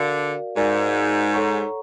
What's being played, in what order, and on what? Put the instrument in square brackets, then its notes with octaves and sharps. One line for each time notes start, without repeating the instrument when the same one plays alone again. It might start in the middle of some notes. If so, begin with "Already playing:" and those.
Already playing: [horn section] D3 [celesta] F#4 A#4 D5 F5
[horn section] G#2 [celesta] F#4 A#4 D5 F5
[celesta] A4 C#5 F#5 A#5 C#6